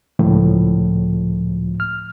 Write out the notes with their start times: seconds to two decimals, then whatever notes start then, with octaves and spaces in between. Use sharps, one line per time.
0.19 C#2 A2 F3
1.80 F6